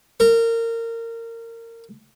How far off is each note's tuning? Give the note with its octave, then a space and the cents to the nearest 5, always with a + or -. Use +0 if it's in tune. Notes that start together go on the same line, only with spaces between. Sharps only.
A#4 -25